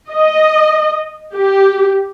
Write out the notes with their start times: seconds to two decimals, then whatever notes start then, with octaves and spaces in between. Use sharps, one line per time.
0.12 D#5
1.35 G4